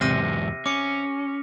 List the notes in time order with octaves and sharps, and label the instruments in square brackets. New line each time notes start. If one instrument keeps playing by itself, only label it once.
[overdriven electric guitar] E2 G#2 [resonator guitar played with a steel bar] C3 [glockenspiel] F6 A#6 D#7
[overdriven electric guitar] C#4 [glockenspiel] D6 C#7